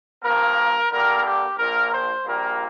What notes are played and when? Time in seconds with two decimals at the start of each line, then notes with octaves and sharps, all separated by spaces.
0.23 G2 F3 A#3 A#4
0.90 G2 D3 G3 A#3 A#4
1.24 G4
1.57 A#1 A#2 A#3 A#4
1.92 C5
2.25 A#1 A#2 G3 A#3 A#4